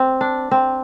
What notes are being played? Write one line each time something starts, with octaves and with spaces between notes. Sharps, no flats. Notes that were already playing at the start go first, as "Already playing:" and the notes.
Already playing: C4
D4
C4